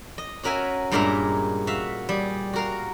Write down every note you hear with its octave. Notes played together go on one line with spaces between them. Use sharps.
D#5
C#4 F#4 A#4 E5 G#5
G2 A#2 G#3 A#4 E5 A#5
F#4 E5 F5
G3 G#4
F#4 A#4 F5